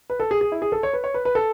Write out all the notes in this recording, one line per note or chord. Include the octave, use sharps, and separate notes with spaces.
B4
A4
G#4
G#4
E4
G#4
A4
C#5
B4
C#5
B4
B4
A4